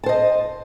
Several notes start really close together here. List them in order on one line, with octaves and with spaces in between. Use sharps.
A5 C5 D#5